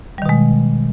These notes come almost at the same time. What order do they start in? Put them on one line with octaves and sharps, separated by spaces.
G3 D#3 B2 G#3